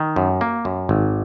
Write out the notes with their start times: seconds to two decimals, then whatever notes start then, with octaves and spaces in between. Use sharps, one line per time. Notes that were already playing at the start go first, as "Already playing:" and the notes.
Already playing: D#3
0.16 F#2
0.41 A#3
0.65 F#2
0.89 G#1